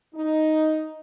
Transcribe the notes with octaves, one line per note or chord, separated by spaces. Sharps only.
D#4